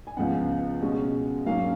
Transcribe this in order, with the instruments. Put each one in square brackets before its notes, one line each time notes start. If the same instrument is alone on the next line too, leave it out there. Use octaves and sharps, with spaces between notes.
[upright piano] G#5
C#2 C#3 F3 B3 F#5
B2 G#3 C#4
G#2 F#3 A#3 C#4 F5